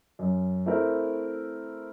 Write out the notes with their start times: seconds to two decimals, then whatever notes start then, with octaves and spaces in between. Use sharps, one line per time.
0.19 F#2
0.66 A3 C4 E4 A#4